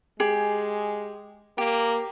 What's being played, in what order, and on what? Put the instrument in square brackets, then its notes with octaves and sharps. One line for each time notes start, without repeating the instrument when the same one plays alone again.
[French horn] G#3 [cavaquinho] G4 G#4
[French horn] A#3 [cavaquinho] G4